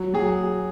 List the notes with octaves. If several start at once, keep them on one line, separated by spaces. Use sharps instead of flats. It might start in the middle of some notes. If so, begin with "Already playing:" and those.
Already playing: F#3
F#3 G#4